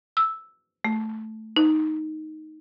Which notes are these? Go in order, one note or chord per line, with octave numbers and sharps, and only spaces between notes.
E6
A3
D#4